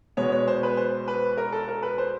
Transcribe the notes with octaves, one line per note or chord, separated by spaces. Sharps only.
E2 B2 G#3 B3 C#5
C#5
C5
B4
C5
B4
A#4
A4
A#4
B4
C5